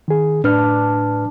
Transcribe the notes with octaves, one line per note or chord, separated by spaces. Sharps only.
D#3 G#4
A2 D4 B4 F6